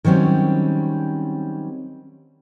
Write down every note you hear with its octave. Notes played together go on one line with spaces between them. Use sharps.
D#3 F#3 G3 C4 C#4